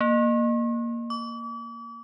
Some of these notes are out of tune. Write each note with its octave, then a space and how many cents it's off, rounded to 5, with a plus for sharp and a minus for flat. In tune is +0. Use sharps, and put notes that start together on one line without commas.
A#3 +5
D6 -40